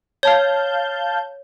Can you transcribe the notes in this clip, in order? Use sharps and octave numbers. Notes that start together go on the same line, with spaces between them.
C#5 F5 A5 G6